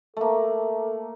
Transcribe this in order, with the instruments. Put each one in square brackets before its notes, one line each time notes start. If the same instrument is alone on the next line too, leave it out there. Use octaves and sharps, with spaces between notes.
[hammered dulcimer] A3 A#3 [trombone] A4